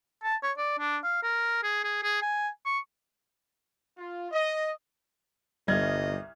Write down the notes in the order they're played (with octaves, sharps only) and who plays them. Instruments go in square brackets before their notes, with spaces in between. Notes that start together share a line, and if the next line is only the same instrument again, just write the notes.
[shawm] A5
C#5
D5
D4
F5
A#4
G#4
G#4
G#4
G#5
C#6
[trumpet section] F4
D#5
[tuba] G1 [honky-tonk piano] C2 F6 G#6 [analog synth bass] G3 [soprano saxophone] D#5